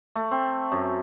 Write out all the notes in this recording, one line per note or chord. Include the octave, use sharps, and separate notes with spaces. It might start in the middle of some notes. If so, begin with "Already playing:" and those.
A3
C4
F#2